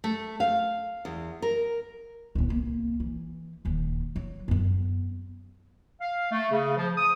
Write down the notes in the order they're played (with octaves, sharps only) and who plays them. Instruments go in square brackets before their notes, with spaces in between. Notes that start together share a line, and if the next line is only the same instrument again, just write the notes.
[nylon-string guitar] A3
F5
E2
A#4
[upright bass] D1 B3
C2 A#3
E3
D#1 D#2
F#3
F#2 B3
[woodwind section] F5
A3
C#3
F3
D#6